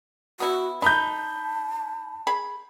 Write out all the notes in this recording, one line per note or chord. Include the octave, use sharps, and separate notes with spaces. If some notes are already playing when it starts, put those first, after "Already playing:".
B3 E4 F#4
D#4 A5 B5 G6
G#4 B5